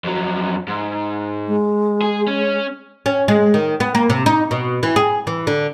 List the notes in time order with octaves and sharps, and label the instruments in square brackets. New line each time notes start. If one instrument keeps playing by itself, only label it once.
[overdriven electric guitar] F2 F#3
G#2
[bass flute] G#3
[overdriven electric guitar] G#4
C#4
[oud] C#4
G#3
D#3
B3
A#3
C3
D#4
B2
E3
G#4
E3
D3